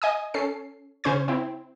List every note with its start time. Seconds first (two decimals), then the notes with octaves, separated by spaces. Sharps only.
0.02 D#5 G#5 D#6
0.34 C#4 A4 C7
1.04 C#3 C#4 C5 C#6 G#6
1.28 C4 E4